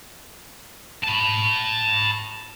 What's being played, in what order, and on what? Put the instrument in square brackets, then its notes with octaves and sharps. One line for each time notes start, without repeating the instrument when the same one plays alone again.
[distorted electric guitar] A5 B5